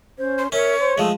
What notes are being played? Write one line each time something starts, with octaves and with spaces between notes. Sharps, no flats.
C#4 C5
C6
C#4 A#4 C#5 E5
C5 C6
F3 G#3 A3 G#4